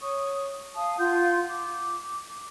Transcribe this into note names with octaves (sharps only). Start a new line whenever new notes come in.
C#5 C#6 D#6
F5 A5 D#6
F4 F#5 C6 G6
D6